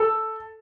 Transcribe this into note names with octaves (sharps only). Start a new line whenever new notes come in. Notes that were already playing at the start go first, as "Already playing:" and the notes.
Already playing: A4